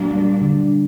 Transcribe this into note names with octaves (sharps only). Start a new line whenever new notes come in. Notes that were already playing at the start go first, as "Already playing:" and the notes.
Already playing: A#2 F#3 A#3 D4
G3
D3